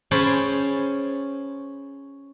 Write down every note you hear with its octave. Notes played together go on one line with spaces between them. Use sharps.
C#4 G#4 C5 G5 A5 B5